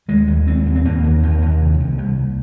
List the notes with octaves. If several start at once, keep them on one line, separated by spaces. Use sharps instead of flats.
D#2 G#3
D#2
D#2 C4
D#2
C4
D#2 A#3
D#2
D#2
D#2
C3
C2
C2